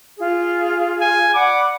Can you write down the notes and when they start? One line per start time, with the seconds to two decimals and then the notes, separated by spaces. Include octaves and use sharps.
0.17 F4 G#4
1.01 G#5
1.34 D5 F#5 B5 D6